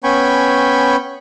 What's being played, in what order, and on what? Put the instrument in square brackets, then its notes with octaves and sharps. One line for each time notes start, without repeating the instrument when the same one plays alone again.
[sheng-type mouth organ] B3 C#4 G5 G#5 B5 C#6